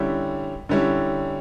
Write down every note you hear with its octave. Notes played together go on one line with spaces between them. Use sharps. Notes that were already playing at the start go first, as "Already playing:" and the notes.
Already playing: D3 G3 C#4 E4
D3 G3 C#4 E4